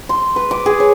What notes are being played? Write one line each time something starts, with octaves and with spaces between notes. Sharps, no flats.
C6
B4
D6
G#4
C#5